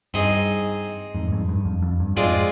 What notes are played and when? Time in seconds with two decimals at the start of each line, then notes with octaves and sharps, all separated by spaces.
0.14 G2 C4 D#4 G#4 D#5
1.15 F2 G#2
1.28 G2
1.31 F2 G#2
1.49 G2
1.65 F2
1.82 F2
2.00 G2
2.16 F2 G#2 G#3 C4 F4 G#4 D5